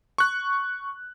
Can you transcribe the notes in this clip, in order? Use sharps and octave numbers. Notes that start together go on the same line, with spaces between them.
C#6 F#6